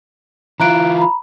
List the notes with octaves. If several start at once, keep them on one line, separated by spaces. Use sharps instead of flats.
E3 E4 F4 A#5 F#6 D7
A#5 B5